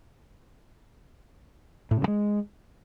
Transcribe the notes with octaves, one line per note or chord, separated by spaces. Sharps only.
A2
C#3
G2
G#3